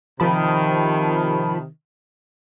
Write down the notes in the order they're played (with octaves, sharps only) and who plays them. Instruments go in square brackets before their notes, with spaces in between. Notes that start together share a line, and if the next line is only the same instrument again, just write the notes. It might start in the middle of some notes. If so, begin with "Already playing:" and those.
[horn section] C3 D#3 [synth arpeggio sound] F3 A5 B5